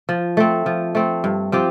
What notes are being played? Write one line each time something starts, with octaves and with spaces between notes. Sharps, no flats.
F3
A3 C4
F3
A3 C4
G2
F3 C4 G4